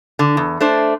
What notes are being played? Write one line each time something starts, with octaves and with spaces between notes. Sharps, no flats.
D3
E2
A3 D4 C5